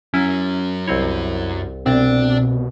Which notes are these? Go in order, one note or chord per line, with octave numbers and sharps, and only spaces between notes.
F#2 F#3 C#4 E4
C2 C4 E4 C#5
C2 B2 C4 D4